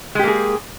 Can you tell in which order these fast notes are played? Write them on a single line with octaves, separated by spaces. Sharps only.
G#3 G4 A#3 G#4